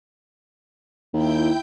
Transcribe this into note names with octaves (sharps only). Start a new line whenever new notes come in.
D#2 E4 G5 G6